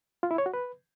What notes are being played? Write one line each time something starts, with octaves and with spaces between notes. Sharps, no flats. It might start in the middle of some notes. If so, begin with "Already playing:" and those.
F4
E4
C#5
F#4
B4